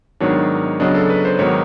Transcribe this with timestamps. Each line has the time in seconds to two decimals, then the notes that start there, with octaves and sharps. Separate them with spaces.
0.20 G#2 D#3 F#3 B3 D4 C#5
0.80 C#3 F#3 B3 D4 D#5
0.95 A4
1.10 B4
1.25 C5
1.39 G#2 D#3 F#3 B3 C#5